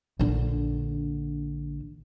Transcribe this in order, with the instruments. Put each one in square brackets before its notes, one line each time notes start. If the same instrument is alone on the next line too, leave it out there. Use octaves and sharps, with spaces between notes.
[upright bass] A#1 D3